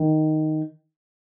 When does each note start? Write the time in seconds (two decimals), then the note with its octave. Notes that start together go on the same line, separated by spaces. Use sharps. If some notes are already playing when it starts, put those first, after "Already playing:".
Already playing: D#3